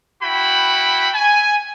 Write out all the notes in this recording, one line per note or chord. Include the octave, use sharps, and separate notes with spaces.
E4 F#4 G5 B5
G#5